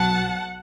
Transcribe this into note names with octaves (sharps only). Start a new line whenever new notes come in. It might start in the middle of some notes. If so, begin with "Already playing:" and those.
Already playing: B1 B2 F#3 F#5 A5